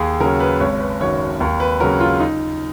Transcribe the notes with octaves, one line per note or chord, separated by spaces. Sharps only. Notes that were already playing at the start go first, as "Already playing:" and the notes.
Already playing: D#2 G#4
C#3 F#3 A#4
B4
G#1 C#5
B4
F#2 D#3 F#3 C#5
D#2 A#4
B4
C#3 F#3 A#4
F4
D#4